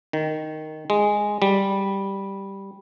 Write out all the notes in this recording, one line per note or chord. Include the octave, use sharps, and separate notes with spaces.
D#3
G#3
G3